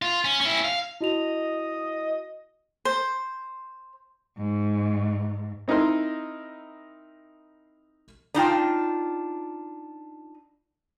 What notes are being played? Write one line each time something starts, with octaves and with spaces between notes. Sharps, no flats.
F4
C#4
C#4 E4
F5
E4 F#4 D#5 F7
C5
G#2
C4 D#4 E4 A#4 C6
D4 D#4 F4 G5